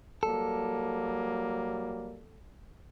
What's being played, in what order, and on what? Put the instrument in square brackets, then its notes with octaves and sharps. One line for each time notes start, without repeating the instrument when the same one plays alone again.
[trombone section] F#3 G3 A#3 [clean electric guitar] A4